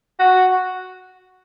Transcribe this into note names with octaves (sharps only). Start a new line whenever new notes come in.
F#4